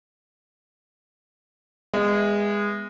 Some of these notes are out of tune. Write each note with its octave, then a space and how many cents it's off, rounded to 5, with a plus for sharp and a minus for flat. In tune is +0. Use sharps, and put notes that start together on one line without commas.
G#3 -20 B3 +0 E5 +0